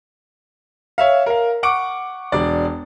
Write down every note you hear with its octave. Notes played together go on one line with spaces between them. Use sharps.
C#5 E5 F5
A#4 F5
F#5 C#6 D6 D7
E1 D4 D5